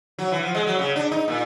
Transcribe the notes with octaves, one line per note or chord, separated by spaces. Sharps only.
F#3
E3
F3
G#3
F#3
C#3
D4
D#4
A#2